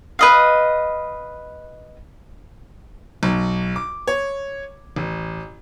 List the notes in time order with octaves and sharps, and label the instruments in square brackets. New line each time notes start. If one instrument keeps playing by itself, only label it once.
[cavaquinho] B4 D#5 F5
[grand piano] B1
D6
C#5
A1